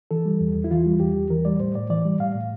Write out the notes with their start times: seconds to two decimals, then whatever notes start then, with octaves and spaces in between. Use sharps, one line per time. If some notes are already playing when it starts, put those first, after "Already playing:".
0.11 E3 A4
0.25 G3
0.41 E2
0.55 E2
0.64 E4
0.71 E3 F4
0.86 G3
1.00 E2 G4
1.15 E2
1.30 E3 A#4
1.45 G3 D5
1.60 A2 C5
1.75 A2 D5
1.90 E3 D5
2.05 G3
2.20 A2 F5
2.35 A2